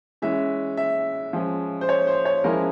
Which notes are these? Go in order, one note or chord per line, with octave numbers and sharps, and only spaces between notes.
E3 G#3 C#4 E5
E5
F3 G#3 C#4
C5
C#5
C5
C#5
F3 G#3 C#4 E4 A#4